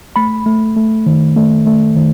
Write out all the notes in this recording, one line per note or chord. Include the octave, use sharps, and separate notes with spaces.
A3 B5
A3
A3
D#3
A3
A3
D#3